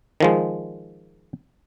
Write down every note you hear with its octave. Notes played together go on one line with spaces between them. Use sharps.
D#3 F3 G#3